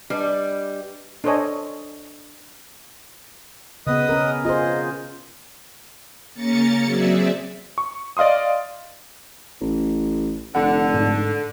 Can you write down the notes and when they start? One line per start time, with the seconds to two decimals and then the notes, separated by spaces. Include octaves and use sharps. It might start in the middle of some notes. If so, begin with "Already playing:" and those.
0.10 G3 D4 B4 D#5
1.24 D4 A4 C5 C#5 D#5 G#5
3.87 C#3 B3 B4 D#5 D#6
4.09 C#4 A#4
4.45 F4 G#4 C5 D#5
6.34 C#3 A#3 C#4 A#4 A6 C#7
6.84 F#3 C4 G#4 D5 E5
7.78 C#6
8.17 D5 D#5 F5 C6 D#6
9.61 A1
10.55 F1 D3 F#5
10.94 G#2